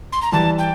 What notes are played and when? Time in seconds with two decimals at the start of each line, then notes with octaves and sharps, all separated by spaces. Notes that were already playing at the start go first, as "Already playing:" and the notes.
0.12 C6
0.22 A#5
0.32 E3 G3 A5
0.59 G5